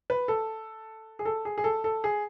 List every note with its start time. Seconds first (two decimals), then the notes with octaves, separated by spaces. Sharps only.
0.10 B4
0.28 A4
1.19 G#4
1.25 A4
1.45 G#4
1.58 G#4
1.64 A4
1.84 A4
2.04 G#4